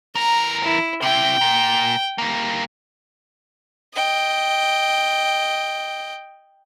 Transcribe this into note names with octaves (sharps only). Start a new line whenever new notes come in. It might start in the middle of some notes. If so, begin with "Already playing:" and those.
E3 A#4 A#5
E4
C3 E4 G5
A#2
G3 A#3
D#5 G5